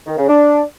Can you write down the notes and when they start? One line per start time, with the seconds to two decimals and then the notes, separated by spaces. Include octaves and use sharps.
0.07 D#3
0.17 C#3
0.28 D4